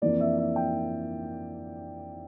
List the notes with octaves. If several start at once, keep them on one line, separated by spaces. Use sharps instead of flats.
F2 E3 A#3 D4 D5
E5
E5
G5